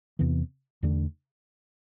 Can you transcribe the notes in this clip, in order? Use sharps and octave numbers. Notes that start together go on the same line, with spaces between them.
E2 C3 E3 B3
E2 D3 A3 D4